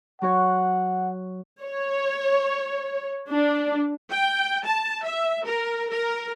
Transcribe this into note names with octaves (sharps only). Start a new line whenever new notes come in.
F#3 F#4 C#5 F#5
C#5
D4
G5
A5
E5
A#4
A#4